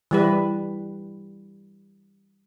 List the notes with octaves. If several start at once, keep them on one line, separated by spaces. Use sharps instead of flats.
E3 G3 B4